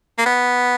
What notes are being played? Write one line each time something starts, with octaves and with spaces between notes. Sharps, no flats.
A#3
B3